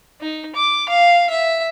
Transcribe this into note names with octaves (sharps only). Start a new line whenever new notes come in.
D#4
D6
F5
E5